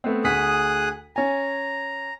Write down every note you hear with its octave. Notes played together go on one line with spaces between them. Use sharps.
A3 B3 C4
D2 G#4 D#6 F#6 B6
C#4 G#5 A#5